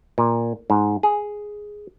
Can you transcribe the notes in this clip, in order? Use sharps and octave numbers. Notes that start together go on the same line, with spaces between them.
A#2
G#2
G#4